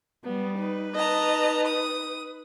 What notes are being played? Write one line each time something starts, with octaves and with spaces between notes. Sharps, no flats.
G3 B3
D#4 B4
D#5 A5 A#5
D#6